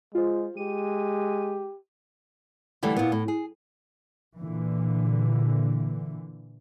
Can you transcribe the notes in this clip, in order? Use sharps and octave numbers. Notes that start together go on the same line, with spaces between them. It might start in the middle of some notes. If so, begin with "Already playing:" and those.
G#3 F4 C5
G#3 G4 D#7
D3 E3 G3 A3
A#2 B3
A2
G#4
A#2 D3 E3